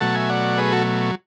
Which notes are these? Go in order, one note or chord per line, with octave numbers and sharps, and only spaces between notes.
B2 F#3 A3 F#5 A5
E5 G#5
D5 F#5
G#4 B4
F#4 A4